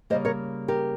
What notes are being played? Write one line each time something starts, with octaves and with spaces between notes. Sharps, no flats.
C#3 G3 A#3 C5 D#5
A#4 C#5
G4 A#4